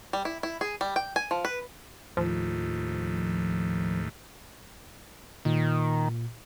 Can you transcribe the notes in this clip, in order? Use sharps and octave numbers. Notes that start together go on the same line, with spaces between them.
G3
E4
E4
G#4
G3
G5
G#5
F3
B4
D#2 A2 F3
A#2 D#3